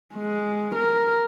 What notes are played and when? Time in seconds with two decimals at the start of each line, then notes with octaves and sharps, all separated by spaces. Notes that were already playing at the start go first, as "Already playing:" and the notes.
0.15 G#3
0.75 A#4